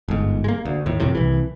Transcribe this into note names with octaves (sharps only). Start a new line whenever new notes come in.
G1 G#2
G#3 A#3
D2
D#2 A2
A#1 F2 A2 C3
C2 E3